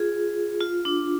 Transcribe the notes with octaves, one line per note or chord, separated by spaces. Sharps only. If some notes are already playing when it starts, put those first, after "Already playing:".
Already playing: F4 G#4
F4
D4